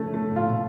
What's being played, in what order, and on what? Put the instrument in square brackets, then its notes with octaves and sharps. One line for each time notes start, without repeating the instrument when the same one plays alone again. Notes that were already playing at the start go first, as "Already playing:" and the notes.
Already playing: [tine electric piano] C#3 [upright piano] A3 C#4
[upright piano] A3
[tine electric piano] A2
[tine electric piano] A#2 [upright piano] F4
[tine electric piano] B2